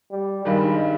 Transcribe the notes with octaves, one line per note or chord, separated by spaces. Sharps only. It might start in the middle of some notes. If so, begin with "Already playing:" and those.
G3
G2 D#3 G3 G#3